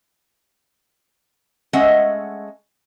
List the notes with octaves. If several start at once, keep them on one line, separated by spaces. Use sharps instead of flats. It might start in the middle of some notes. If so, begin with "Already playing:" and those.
G#3 A3 C#4 D#5 E5 F#5